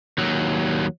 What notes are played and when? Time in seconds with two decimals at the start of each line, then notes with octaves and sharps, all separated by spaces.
0.18 D#2 F#3